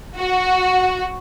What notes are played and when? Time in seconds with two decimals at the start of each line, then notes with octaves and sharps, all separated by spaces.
0.17 F#4